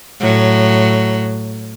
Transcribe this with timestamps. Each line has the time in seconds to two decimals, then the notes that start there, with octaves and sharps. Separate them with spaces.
0.20 A2 F#3